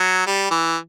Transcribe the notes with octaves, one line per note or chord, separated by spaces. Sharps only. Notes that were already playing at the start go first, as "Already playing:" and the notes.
Already playing: F#3
G3
E3